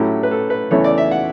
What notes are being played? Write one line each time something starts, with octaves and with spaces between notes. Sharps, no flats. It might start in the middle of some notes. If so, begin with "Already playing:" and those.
Already playing: A2 F#3 A3 C#4 E4 G4
B4
A4
B4
E2 C#3 E3 A3 E4 C#5
D5
E5
F#5